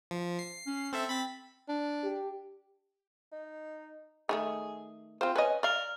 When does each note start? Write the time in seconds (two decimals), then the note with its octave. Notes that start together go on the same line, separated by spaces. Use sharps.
0.11 F3
0.39 C7
0.66 C#4
0.93 C4 A4 E5
1.09 C4 B5 A6 B6
1.68 D4
2.03 G4
3.32 D#4
4.29 D#3 F3 A3 G#4
5.21 C4 F4 C5
5.36 C#4 B4 D#5
5.63 A#4 D5 F5